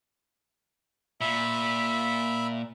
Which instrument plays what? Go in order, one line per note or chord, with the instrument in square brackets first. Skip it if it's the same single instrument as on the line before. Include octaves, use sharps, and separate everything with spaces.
[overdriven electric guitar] A#2 [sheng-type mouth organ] E5 B5